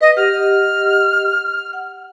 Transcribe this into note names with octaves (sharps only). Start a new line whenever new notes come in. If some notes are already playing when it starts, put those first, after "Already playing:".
B4 D#5
G4 D#5 F#5 F6
F#5